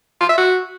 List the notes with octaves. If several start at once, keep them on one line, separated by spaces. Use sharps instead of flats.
F4
E5
F#4